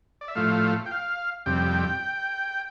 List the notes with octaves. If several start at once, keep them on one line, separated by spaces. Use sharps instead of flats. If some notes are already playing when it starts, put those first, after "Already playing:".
D5
E5
A2 F3 A3 F5
G5
F5
F2 C3 G3 G5